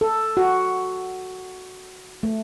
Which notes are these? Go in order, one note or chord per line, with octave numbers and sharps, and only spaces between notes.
A4
F#4
A3